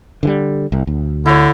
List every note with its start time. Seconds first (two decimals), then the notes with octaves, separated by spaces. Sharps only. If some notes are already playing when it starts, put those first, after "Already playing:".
0.23 D3 E3 G3
0.72 C2
0.87 D2
1.26 D3 E4 C#5